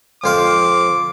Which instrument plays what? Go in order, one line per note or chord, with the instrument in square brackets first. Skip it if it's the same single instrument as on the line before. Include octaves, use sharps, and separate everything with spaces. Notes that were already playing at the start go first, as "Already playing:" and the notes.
[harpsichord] F2 C5 F5 [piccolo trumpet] D6